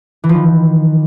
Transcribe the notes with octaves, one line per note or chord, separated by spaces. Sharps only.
E3
F3
D#3